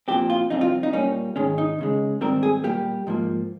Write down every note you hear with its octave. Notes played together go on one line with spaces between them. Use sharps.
A#2 F3 C4 G4
F4
F2 C3 G3 C4 D#4
F4
D#4
A#2 G3 A#3 C#4
G#2 D#3 G#3 C#4
D#4
C#2 C#3 G#3
G#2 D#3 G3 C4 A#4
G#4
A#2 G3 A#3 G4
G#2 F3 A#3